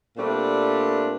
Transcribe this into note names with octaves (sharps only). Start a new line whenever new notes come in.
A#2 G3 A3 C4 D4